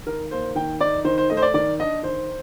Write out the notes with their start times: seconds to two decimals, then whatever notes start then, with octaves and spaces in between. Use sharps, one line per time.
0.06 D#3 A#4
0.31 A#3 C5
0.55 D#3 G5
0.80 D#4 D5
1.05 D#3 C5
1.18 C5
1.30 A3 D#5
1.37 C5
1.42 D5
1.54 D#3 D5
1.80 D4 D#5
2.03 D#3 C5